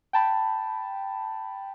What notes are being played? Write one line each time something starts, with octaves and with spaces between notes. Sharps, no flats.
G5 A5 B5